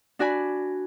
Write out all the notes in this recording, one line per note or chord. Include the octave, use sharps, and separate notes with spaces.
D4 F#4 D5 G#5 B5